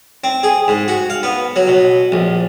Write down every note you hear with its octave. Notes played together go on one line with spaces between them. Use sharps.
C4
G#4
G#2
F#4
F5
B3
F#3
B2
A#1